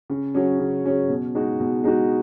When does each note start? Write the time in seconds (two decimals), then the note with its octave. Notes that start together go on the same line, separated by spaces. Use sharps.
0.10 C#3
0.34 F#3 C#4 G#4
0.60 C#3
0.85 F#3 C#4 G#4
1.09 B2
1.35 G#3 D#4 F#4
1.60 B2
1.84 G#3 D#4 F#4